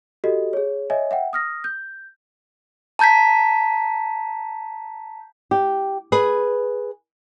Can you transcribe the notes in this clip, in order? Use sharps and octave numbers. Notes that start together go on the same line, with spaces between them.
F#4 G4 A4 D#5
G#4 C#5
C#5 D#5 E5 G#5
E5 F#5 G5
D#6 F6 A#6
G6
A5 A#5 G6 G#6 B6
G4
G#4 B4